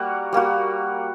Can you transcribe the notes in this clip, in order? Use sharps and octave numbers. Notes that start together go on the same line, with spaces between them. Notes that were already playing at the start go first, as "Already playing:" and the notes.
Already playing: G3 A#3 F#4
G3 A#3 F#4